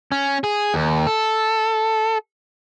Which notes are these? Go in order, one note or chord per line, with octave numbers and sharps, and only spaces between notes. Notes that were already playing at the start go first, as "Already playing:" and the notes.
C#4
G#4
D#2
A4